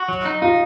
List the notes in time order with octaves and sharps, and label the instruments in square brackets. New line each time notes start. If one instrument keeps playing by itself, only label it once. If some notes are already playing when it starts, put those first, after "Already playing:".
Already playing: [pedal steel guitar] F#4
F#3
D#4
[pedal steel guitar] D#4 [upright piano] F4